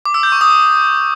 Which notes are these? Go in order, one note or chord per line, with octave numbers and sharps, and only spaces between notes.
D6
E6
G6
C#6
D#6